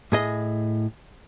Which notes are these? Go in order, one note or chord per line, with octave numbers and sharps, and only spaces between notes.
A2 G#4 D#5